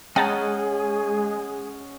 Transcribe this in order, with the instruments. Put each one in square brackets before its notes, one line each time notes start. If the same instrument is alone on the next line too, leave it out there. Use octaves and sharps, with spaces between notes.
[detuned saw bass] G#3 [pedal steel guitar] C#4 D#5 F#5 [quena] G#4 [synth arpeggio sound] G5 A5 A#5